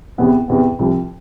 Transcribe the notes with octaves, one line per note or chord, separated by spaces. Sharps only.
E2 C3 E3 B3
E2 C3 E3 B3
C2 C3 F3